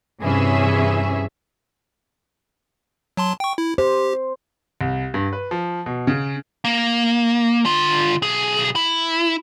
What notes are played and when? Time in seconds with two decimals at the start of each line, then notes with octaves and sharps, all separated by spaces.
0.22 G2 C3 E3 C#4 G#4 E5
3.17 F#3 A5 C6
3.40 G5 C#6
3.58 E4
3.78 G4 C5
4.81 C2
5.14 G2
5.33 B4
5.51 F3
5.86 B2
6.07 C#3
6.65 A#3
7.65 D3 F4
8.22 B1 G#4
8.76 E4